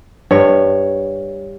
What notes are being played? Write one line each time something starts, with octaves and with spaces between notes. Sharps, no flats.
G2 C#5